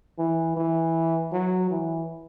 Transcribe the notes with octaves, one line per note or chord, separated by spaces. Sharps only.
E3
E3
F#3
E3